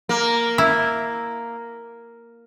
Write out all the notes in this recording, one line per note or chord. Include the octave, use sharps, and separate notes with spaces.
A#3
E4